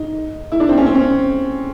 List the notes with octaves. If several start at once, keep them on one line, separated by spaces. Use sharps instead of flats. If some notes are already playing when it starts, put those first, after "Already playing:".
Already playing: D#4
E4
D4
C4
C#4
C4
C#4